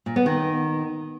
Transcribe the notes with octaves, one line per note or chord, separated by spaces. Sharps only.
A#2
B3
D#3